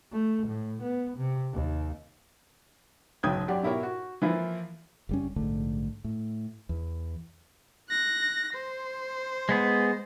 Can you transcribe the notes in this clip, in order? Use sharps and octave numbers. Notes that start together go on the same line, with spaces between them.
A3
A2
B3
C3
D#2
F#1 B1 G5 D#6 G6 G#6
F#2 G4 D5 F#5
B2 E4 G4 A#4 C#5 E5
F#4
E3 F3 A#3 E4 F4
F#1 G3 C#4
A#1 G#2 D3 A3
A2
E2
F#6 A#6
C5
G#3 B3 G#4